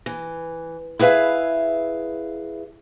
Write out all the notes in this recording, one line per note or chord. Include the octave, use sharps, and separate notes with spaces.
E3
E4 G#4 B4 E5 F5